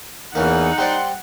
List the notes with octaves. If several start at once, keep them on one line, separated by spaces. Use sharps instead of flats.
E2 E3 A#3 C#4 D#4 F#5
G3 C4 D5 C6